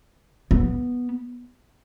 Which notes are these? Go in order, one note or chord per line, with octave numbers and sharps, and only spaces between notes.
B3